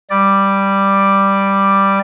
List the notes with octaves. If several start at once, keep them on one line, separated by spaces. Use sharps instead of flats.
G3 D5